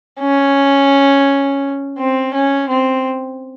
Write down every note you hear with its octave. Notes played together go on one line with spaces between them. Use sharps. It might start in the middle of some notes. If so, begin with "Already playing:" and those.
C#4
C4
C#4
C4